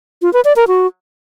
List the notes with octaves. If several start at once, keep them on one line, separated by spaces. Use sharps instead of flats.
F4
B4
D5
A#4
F#4